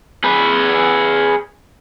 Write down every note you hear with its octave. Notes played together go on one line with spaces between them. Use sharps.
G#4 B4